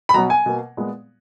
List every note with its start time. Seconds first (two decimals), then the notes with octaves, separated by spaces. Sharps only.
0.09 B5
0.14 B2 F#3 B3 A#5
0.30 G#5
0.46 B2 A#3
0.77 A#2 G#3 B3